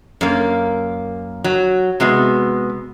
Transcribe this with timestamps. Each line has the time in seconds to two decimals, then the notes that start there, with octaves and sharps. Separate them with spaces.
0.21 F#2 A#3
1.44 F#3
2.00 C3 G#3 B3 F#4